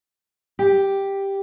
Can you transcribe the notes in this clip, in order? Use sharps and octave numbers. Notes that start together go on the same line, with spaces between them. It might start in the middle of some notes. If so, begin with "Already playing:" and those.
G4